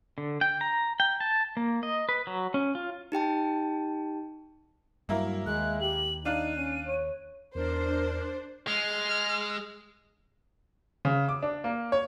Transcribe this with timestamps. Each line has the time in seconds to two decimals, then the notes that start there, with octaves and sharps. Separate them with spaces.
0.18 D3
0.41 G5
0.61 A#5
1.00 G5
1.20 A5
1.57 A#3
1.83 D#5
2.09 B4
2.27 F#3
2.54 C#4
2.75 F4
3.12 D#4 G4 G5 A5
5.09 G2 F#3 A#3 E4 A#4
5.46 D#2 G#3 F#6
5.81 G4 F#7
6.25 D4 D#4 F5 F#6 D#7
6.56 C#4
6.87 C#5
7.55 E2 D4 A#4 C5
8.68 G#3 F6
11.05 C#3
11.28 D6
11.43 D4
11.64 A#3
11.92 C#5